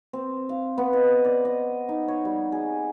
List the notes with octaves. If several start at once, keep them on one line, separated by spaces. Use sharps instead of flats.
C4
F5
B3
D#5
D5
D#5
D#4
C#5
G3
G#4